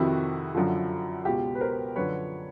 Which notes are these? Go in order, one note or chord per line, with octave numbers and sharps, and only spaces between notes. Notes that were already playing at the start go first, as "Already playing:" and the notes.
Already playing: F2 C3 D#3 E4 F#4
F#2 D3 F3
C#2 B2 F4 G4
B4
A#4 C5
F#2 D3 F3 B4 C#5